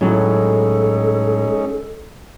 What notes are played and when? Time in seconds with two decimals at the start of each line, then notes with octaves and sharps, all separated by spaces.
0.01 A2 F#3 G#3 C#4 D#4 A4